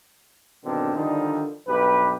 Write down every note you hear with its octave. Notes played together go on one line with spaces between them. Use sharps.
G2 B2 D3 D#3 C4
D3 D#3 F3 G3 D#4
B1 G2 G4 B4